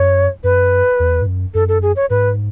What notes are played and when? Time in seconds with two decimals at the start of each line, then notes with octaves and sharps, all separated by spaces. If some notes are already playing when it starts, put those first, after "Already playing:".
Already playing: F#2 C#5
0.44 F#2 B4
1.00 E2
1.22 G#2
1.26 F#2
1.54 F#2 A4
1.68 A4
1.82 G#4
1.96 C#5
2.10 G#2 B4